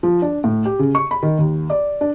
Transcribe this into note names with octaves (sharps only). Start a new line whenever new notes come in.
F3
D4
A2
G4
C#3
C#6
B5
D#3
D#2
D5
D4